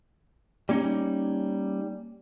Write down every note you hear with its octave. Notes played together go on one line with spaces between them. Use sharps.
G3 A#3 C#4 D#4